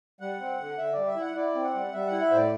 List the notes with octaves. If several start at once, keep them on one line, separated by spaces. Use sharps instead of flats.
G3 F#5
C4
D3
D3 E5
G3 D5
E5
E4
F#5
E4 D5
C4
F#5
G3
G3 E5
E4 F#5
E5
A2 C5
D5